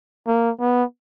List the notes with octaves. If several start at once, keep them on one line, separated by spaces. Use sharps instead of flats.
A#3
B3